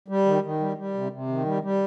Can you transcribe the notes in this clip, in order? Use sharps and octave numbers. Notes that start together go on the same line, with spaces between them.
G3
D#3
D#3
G3
G3
C3
C3
D#3
G3
G3